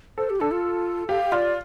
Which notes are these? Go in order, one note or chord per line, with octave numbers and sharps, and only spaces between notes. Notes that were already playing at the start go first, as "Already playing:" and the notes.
A4 C5
G4
D4 A4
F4
G4 F5
F4 D5